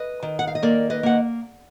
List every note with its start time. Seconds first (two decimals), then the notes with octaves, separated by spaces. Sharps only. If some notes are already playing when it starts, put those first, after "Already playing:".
Already playing: B4 D#5
0.23 D#3
0.39 F#5
0.47 F5
0.55 D#5
0.63 A#3 A#4 D5
0.90 B4 D#5
1.03 A#3 F#5